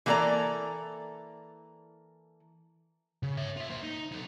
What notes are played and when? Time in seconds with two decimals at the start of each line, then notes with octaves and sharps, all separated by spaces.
0.06 E3 A#3 E4 A4 D5 A#5
3.23 C#3
3.37 C#5 E5
3.57 F4 E5
3.70 A#3 C5
3.83 D#4
4.12 D#4 A4